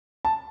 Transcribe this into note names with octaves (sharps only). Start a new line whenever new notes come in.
A5